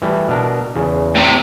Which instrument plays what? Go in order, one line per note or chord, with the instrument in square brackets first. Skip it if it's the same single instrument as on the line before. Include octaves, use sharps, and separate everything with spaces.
[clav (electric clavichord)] E3 G3 A3
B2 D4 A#4
E2 C#3
[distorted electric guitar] A2 C3